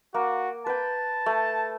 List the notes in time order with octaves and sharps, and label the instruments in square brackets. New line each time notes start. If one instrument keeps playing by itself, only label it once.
[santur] A#3 [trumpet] F#4
[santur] B4 G5 [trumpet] A5
[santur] A3